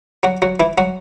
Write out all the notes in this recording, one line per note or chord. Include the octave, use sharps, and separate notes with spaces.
F#3 F#4
F#3 F#4
E3 E4
F#3 F#4